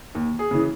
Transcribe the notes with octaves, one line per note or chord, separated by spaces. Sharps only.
D#2
G#4
C#3 E3